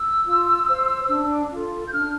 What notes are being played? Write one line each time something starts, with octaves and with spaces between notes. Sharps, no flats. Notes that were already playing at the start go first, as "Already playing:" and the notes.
Already playing: E6
F4
C5
D4
F4 A4
G6
D4 F6